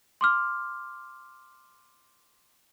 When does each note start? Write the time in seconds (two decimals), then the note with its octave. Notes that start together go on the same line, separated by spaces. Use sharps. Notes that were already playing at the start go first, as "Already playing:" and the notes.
0.21 C6 D6 F6